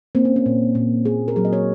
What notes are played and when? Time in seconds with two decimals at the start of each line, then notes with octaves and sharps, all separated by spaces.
0.15 A#3 C4
0.25 C#4
0.36 C4
0.46 A#2
0.75 A#2
1.05 A#3 G#4
1.28 A#4
1.36 F#3 G#4
1.45 D#5
1.53 C#5